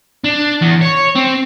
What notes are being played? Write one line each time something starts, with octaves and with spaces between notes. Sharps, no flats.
D4
E2
C#5
C4